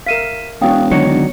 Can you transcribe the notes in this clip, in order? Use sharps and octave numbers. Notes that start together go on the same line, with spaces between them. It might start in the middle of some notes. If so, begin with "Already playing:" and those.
A#4 E5 F5 B6 D#7 E7
E1 C#4 D4 F#4 F5 G5 D#6
D3 D#3 F#3 B3 C#5 C#7